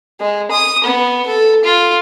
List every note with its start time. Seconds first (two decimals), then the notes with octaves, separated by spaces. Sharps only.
0.20 G#3
0.51 D#6
0.84 B3
1.27 A4
1.65 F4